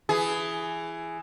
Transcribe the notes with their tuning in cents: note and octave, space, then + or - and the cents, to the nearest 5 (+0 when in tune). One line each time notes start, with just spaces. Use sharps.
E3 +15 G#4 +5